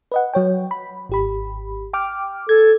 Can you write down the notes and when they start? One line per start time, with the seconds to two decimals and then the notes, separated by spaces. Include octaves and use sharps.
0.12 B4 D#5 F#5
0.34 F#3 C#5 G5
0.71 B5
1.09 G#1 G4 B5
1.93 G5 D6 F6
2.49 A4 G#6